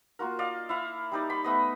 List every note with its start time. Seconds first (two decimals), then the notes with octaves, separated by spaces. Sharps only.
0.19 A#3 F4 F#4 A#4
0.39 D5 D#5 F5
0.69 E4 F5
1.12 G3 D#4 D5
1.30 B5 C6
1.44 A3 B3 D#5